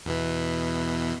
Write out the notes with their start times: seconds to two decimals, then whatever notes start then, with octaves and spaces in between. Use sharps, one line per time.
0.05 E2 B2 E3